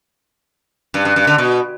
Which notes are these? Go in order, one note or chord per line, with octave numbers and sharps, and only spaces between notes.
G2
G2
G2
D3
B2